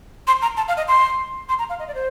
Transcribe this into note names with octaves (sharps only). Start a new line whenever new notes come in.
C6
A#5
A5
F5
D#5
C6
C6
A#5
F5
D#5
D5
C5